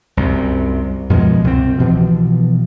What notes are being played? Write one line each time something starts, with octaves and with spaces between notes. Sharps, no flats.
C2 F#2 C3
F#2 B2 F3 G#3
C2 C4
B2 E3 F3